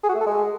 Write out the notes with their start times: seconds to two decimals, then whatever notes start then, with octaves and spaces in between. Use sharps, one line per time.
0.03 G#4
0.09 F#4
0.15 A3
0.21 A4
0.26 G#3